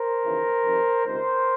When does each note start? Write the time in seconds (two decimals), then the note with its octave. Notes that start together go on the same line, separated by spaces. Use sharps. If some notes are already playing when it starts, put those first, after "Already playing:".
Already playing: A#4 C5
0.24 D#2 C#3 E3
0.64 F2 C3 D#3
1.04 C#2 C3 D#3 A#4 C5